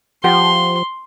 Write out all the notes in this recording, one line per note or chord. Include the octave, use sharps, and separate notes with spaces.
F3 F4 G4 F#5 C6